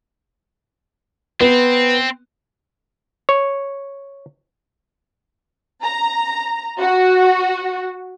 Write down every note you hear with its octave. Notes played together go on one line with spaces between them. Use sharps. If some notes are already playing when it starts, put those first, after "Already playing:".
B3 C4
C#5
A#5
F#4